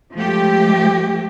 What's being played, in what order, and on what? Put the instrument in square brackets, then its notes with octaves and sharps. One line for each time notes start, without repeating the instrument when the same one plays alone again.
[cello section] F3 G#3 A3 G4